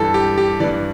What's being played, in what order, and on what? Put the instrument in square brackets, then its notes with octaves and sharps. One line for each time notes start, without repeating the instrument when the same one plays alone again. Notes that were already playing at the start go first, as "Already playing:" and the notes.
Already playing: [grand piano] G2 E3 A4
G4
G4
E3 D5
G2